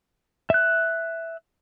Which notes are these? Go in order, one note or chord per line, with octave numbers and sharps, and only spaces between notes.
E5 F#6